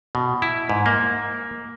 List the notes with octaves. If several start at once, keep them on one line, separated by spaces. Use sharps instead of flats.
B2
E4
G#2
A#3